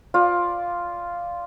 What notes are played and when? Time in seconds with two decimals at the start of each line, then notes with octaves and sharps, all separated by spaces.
0.14 F4 D5